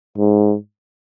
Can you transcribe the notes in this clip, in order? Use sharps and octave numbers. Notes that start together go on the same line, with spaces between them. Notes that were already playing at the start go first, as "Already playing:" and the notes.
G#2